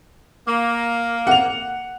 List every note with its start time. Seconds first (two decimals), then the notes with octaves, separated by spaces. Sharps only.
0.46 A#3
1.27 F#5 F7